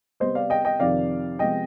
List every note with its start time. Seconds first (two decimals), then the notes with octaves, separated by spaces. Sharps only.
0.20 C3 G3 B3 C5 D#5
0.35 D5 F5
0.50 D#5 G5
0.65 D#5 G5
0.80 F2 C3 D#3 D5 F5
1.39 C3 F3 G#3 B3 D#5 G5